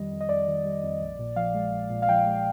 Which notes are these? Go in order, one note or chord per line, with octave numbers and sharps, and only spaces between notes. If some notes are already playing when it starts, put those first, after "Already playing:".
Already playing: F2 D#3 G3 D#5
F2
D#5
F2 D5
D#3
G3
F2
A#1
A#2
F3 F5
G#3
A#1
A#2
F5
F3 G5
G#3